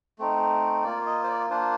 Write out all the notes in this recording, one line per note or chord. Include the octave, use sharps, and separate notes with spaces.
A3 C4 D#4
A#3 F4 D5
D#5
C5
D5
A#3 D4 F4 C5